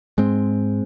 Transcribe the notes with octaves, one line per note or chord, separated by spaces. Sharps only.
G#2 G#3 C4